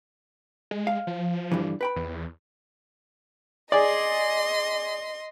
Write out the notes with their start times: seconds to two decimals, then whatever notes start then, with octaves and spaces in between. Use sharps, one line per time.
0.71 G#3
0.87 F5
1.07 F3
1.52 G2 D3 E3
1.81 B4 G5 B5
1.96 E2
3.72 G#4 D5 D#5 C6